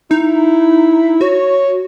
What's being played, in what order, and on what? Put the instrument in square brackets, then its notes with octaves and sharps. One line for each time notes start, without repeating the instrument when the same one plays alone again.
[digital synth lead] D#4 [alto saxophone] E4
[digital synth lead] F#4 [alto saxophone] C#5